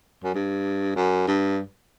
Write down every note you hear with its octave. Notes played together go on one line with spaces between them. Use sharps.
F#2
G2
F#2
G2